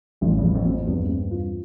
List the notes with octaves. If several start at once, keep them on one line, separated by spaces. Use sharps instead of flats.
A1 F2
E2 G2 F3
F2 A2
C4
F2
E2 G2
C4
F4